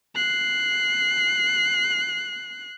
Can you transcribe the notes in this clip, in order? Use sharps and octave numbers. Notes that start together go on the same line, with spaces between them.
F#6 C7